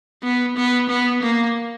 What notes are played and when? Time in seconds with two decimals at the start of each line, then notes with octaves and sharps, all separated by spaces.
0.23 B3
0.56 B3
0.89 B3
1.22 A#3